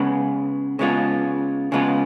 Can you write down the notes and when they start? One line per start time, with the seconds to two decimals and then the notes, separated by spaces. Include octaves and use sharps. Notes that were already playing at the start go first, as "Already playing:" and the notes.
Already playing: C#3 G#3 B3
0.79 C#3 G#3 B3 F4
1.72 C#3 G#3 B3 F4